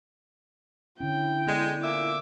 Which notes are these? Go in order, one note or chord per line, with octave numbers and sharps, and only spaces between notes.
D3 C#4 E4 G5
G#3 B3 A4 D5
A#2 E5 D6